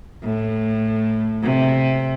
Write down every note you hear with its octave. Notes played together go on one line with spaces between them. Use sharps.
A2
C3